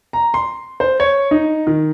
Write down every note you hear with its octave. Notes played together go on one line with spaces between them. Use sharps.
A#5
C6
C5
C#5
D#4
D#3